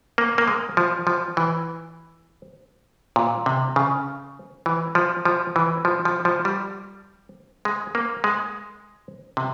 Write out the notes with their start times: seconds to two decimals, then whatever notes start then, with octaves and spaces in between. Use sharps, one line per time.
0.18 A#3
0.38 A#3
0.48 G#3
0.77 F3
1.07 F3
1.37 E3
3.16 A#2
3.46 C3
3.76 C#3
4.66 E3
4.95 F3
5.25 F3
5.56 E3
5.85 F3
6.05 F3
6.25 F3
6.45 G3
7.65 G#3
7.95 A#3
8.24 G#3
9.37 C3